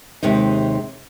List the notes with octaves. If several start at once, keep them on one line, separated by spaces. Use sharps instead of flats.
D#2 C3 G#3 D#4